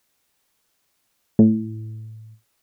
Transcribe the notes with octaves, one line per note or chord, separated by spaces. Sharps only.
A2